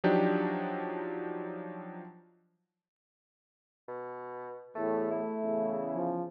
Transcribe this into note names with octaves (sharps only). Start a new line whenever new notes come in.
F3 F#3 D4 D#4 G4
B2
E2 A2 A3
A3 E4
E2 C#3
F3